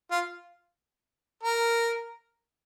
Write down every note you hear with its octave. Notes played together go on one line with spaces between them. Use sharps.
F4
A#4